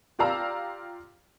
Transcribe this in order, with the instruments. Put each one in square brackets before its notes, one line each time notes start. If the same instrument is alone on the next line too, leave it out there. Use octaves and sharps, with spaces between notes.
[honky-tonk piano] F4 G4 D5 F5 A#5 E6